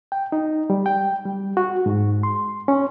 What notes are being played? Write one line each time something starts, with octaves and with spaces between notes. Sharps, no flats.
G5
D#4
G3
G5
G3
F#4
G#2
C6
C#4